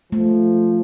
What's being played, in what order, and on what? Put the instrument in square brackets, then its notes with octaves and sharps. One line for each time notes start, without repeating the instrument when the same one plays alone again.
[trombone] F3 [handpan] A3